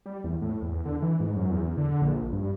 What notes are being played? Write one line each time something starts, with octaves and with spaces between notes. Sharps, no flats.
G3
E2
A2
E2
D3
E3
G#2
F#2
E2
D3
A#1
G2